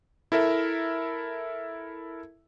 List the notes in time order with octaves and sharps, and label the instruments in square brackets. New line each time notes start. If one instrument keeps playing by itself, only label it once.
[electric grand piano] E4 A4 A#4 E5